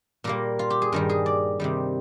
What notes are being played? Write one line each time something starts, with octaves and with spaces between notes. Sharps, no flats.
A#2 G3 A#3 A#4
F4
G4
G#4
G2 D#3 G3 A#4
G#4
D5
C3 D#3 G3